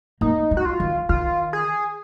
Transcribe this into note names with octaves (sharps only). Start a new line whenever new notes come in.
A#3 D#4
G#3
F#4
F4
D#3
D#3 F4
G#4